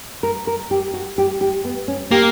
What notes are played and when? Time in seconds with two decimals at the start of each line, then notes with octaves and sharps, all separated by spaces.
0.23 A#4
0.47 A#4
0.71 G4
0.94 F#4
1.18 G4
1.41 G4
1.65 B3
1.88 C#4
2.11 A#3 G4